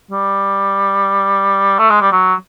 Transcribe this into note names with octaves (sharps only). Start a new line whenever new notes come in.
G3
A3
G#3
G3
F#3